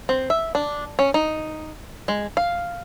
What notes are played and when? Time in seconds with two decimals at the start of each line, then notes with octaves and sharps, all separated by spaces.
0.09 C4
0.30 E5
0.55 D4
0.99 C#4
1.14 D#4
2.08 G#3
2.37 F5